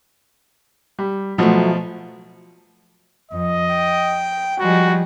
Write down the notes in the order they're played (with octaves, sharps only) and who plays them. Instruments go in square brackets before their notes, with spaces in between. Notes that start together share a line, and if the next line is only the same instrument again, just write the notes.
[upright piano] G3
[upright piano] B2 F3 [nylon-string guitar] F#3 A3
[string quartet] F2 [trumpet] D#5
[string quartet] G5
[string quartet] F3 G3 G#3 [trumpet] F#4